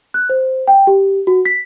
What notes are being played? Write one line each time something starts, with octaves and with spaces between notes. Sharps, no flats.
F#6
C5
G5
G4
F#4
B6